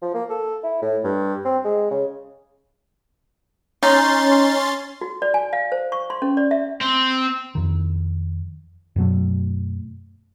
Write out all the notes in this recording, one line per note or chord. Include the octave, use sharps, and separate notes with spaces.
F3
A#3
A4
E4
A2
G2
C4
G#3
C#3
C#4 D#4 C6 A6
F#4
D5
G#5
F5
C5
C#6
C6
C#4
D5
E5
C4
F2 D#3
F#2 B2 F#3 A3